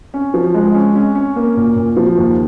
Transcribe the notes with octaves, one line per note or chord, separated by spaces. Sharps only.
C#4
F3
G#3
C#4
C#4
C#4
A#3
A#2
A#2
F3
D#2